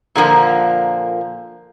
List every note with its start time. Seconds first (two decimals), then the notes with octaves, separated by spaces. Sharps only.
0.15 A#2 D3 F3 A#3